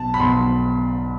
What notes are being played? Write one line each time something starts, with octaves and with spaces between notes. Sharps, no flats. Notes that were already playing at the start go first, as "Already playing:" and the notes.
Already playing: B1 A5
B5
B1 C6